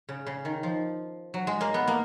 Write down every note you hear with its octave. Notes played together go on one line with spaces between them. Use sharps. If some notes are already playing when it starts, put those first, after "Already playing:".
C#3
C#3
D#3
F3
F#3
G#3
A#3
B3
A#3